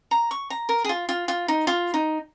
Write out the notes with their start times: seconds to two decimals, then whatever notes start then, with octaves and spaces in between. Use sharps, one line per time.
0.11 A#5
0.31 C#6
0.50 A#5
0.69 A#4
0.85 G#4
0.89 F4
1.09 F4
1.28 F4
1.48 D#4
1.67 F4
1.94 D#4